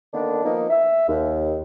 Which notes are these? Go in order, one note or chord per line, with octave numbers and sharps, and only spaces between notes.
D3 D#3 A#3 B3 D4
F3 A#3 B3 D#4
E5
D#2